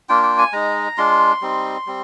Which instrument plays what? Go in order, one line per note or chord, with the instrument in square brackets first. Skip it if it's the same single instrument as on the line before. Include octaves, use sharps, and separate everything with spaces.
[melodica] A#3 D4 F4 G5
G5
G#5
G#3 D#4 A#5
G#3 D4 F4 C6
G3 C4 D#4
G3 C4